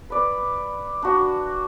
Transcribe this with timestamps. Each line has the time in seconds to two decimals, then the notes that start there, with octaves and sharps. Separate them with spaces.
0.10 B4 D5
1.02 D4 F#4